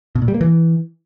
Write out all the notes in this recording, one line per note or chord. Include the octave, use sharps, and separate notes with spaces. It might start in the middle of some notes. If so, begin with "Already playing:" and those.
B2
A#2
G3
A#3
E3